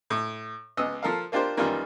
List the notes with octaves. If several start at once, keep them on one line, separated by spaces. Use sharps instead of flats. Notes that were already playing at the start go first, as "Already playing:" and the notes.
A2
C#2 B3 D#5 E6
F3 A4 A#4 F5
A#3 D4 F4 G4 A#4 C5
F#2 D#3 E3 G3 A#3 F4